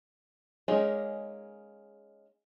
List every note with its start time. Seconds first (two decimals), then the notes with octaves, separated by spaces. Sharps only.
0.68 G#3 A#3 C#4 D#4 G#4